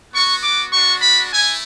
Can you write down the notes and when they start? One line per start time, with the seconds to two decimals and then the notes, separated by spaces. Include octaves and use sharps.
0.13 B3 F#4 C#6
0.43 D6
0.72 G#3 D4 F#4 C#6
1.02 B5
1.32 A3 E4 G#5